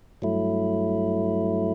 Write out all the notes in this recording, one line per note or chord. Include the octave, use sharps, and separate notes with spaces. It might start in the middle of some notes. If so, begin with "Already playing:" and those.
G2 F#3 A3 E4